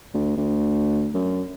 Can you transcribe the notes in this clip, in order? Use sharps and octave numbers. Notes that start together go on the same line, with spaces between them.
D2
D2
F#2